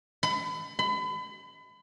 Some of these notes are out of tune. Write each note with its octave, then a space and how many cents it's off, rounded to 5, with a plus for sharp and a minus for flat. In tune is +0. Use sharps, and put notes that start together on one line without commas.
B5 +35
B5 +35